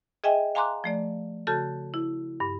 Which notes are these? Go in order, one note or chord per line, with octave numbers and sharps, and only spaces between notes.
G#4 D#5 E5 G5 G#5
F5 G#5 A#5 C6 D6 F#6
F3 A3 D5
C#3 F#4 A4 A5 G6
E4
G2